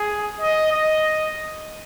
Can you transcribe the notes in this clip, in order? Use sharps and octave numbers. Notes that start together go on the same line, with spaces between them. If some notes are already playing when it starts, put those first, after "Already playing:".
Already playing: G#4
D#5
D#5